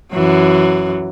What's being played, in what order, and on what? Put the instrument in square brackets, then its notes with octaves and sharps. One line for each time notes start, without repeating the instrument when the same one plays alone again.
[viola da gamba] F#2 E3 F#3